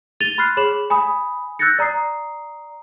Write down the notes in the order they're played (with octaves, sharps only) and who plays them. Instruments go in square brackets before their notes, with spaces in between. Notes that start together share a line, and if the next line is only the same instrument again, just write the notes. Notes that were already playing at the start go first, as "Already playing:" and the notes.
[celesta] A6 D#7 F7 G7
B5 C6 F6 F#6 C7
G#4 C#5 B5 E7 F#7
G#5 B5 D#6
E6 F#6 G6 A6 A#6 C#7
D5 A#5 D#6 C7